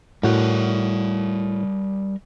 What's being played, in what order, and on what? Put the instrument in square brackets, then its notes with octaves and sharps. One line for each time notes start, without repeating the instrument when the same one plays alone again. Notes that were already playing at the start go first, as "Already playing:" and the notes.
[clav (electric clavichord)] A2 F#4 [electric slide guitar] G3 A#4 D5